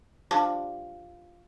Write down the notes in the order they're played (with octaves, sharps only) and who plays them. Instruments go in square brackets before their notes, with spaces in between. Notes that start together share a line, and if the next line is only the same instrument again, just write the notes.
[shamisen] F3 G3 D4